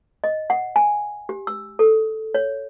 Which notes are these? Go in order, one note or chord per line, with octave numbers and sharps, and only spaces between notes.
D#5
F#5
G#5
G4
E6
A4
C#5